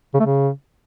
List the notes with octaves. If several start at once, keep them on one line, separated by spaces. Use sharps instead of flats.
C#3
A3
C#3